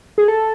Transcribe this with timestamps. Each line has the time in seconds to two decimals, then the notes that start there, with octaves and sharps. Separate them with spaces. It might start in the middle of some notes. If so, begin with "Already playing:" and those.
0.18 G#4
0.28 A4